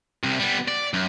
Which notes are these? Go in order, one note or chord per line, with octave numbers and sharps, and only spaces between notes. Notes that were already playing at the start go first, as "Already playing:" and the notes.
C2 C3
G3 B3
D5
F#2